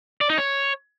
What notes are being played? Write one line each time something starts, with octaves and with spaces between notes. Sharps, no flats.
D5
D#4
C#5